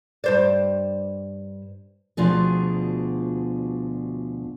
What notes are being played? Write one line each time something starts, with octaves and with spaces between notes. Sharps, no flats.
G2 C5 D5
D2 B2 F3 D4 G#4